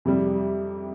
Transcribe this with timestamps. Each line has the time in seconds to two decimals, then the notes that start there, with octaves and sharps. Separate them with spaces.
0.05 F2 C3 G3